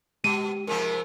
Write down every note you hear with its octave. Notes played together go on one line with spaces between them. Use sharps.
B2 G#3 G4 D#7
G#2 C3 F3 A#4